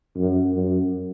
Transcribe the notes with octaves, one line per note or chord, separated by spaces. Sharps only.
F#2
F#2